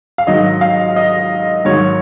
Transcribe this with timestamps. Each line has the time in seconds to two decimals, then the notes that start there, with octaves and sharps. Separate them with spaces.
0.18 F5
0.27 G#2 D#3 F#3 D#5
0.61 F5
0.96 D#5
1.65 G#2 D#3 F#3 C#5